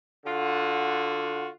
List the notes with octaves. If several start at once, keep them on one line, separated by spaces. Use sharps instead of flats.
D3 F4 F#4